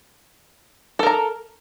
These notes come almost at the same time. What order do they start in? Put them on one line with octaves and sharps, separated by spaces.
A4 A#4 A#5